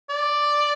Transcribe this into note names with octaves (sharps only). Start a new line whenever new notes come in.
D5